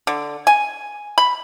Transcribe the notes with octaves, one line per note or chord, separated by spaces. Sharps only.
D3
G#5
B5